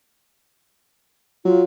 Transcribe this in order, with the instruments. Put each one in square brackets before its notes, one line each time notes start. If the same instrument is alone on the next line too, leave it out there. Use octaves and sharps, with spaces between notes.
[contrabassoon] F#3 [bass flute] F4